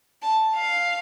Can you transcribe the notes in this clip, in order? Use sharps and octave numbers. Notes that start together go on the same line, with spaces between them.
A5
F5